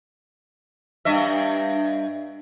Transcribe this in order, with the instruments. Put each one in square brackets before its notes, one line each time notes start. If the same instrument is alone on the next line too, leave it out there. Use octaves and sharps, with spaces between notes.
[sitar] G2 D#5 E5